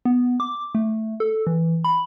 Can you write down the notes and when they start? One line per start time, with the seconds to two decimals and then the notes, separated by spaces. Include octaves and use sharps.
0.05 B3
0.40 D6
0.75 A3
1.20 A4
1.47 E3
1.84 B5